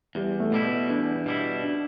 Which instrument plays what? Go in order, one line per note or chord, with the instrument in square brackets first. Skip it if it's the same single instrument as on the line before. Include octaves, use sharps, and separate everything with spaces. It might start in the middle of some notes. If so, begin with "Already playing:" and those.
[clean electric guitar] E2 [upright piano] G3
[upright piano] A3
[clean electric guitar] B2 G3 E4
[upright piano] B3
[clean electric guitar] E2 [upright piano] D4
[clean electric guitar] B2 G3 E4
[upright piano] D4